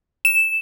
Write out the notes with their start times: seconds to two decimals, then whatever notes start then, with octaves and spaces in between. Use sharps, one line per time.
0.25 E7